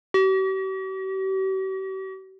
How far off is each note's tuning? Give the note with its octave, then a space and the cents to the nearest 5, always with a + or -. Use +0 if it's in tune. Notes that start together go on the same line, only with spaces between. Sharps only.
G4 -45